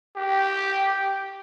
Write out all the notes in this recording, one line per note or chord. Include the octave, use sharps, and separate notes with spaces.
G4